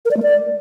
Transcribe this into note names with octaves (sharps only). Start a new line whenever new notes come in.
A#4
D5
A3
D5